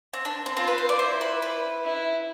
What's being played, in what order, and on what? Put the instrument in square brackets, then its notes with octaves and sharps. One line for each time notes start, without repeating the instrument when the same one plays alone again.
[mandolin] C4
D4
C4
[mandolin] C4 [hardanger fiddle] F4
[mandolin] B4
C5
D5
[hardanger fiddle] E4 [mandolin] C5
[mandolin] B4
B4
[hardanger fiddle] E4